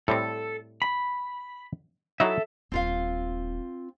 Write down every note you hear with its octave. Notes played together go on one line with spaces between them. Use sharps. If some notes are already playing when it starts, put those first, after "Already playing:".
A2 G3 C4 A4
B5
F#3 D#4 E4 A4 E5
D#1 C4 F4 F5